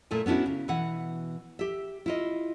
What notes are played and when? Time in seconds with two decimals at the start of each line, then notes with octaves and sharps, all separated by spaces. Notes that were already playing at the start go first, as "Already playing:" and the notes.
0.11 A#2 A3 E4 G#5
0.26 B3 C#4 D4 E4 F#4
0.46 C#3
0.68 B2 E3 F#5
1.59 G4 E5
2.06 E4 F4 D#5